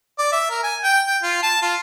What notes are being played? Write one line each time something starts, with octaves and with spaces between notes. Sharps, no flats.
D5
E5
A#4
G#5
G5
G5
F4
A5
F4